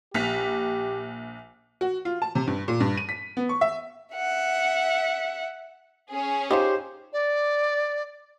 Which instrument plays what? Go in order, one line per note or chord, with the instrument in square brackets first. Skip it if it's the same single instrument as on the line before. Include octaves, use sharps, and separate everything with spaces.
[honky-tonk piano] A#1 B6 F7 [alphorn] G4
[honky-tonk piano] F#4
F4
A5
C3
G2
A#2
G2
D#7
B6
B3
C#6
E5
[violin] E5 F#5
[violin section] C#4 G#4
[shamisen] D#4 F4 C#5 [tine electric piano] G4 [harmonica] C5
[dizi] D5